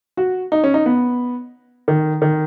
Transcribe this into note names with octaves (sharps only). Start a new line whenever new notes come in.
F#4
D#4
C#4
D#4
B3
D#3
D#3